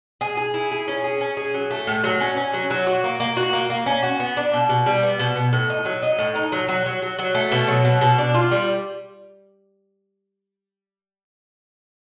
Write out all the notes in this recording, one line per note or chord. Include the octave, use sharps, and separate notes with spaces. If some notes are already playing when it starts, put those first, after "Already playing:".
G#4
G#4
E4
G#4
C#4
G#4
C#4
G#4
F#3
A3
A2
F#3
C#4
C#4
F#3
F#3
F#4
A#3
A#3
F#4
A#3
A#3
C#4
F#4
B3
D4
B2
B2
G3
B3
B2
B3
A2
D#4
F#3
D#4
A2
D#4
F#3
F#3
F#3
F#3
F#3
A3
B2
F#3
B2
B2
D4
F4
G3